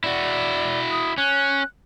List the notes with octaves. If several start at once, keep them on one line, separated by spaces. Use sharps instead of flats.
E4 F#4 D5
D#6
C#4 F#6